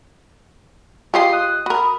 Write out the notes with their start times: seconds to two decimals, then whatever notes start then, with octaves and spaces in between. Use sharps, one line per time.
1.14 G#3 F4 G4 D#5 C6 C7
1.33 D#6 F#6
1.66 F#4 A#4 B5